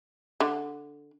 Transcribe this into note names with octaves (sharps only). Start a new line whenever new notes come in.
D3